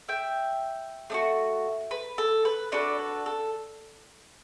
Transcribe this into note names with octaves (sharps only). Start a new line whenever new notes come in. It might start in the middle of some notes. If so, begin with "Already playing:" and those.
E5 G5
A3 D4 F#4
B4
A4
B4
D4 F#4 A4 B4 D5
B4
A4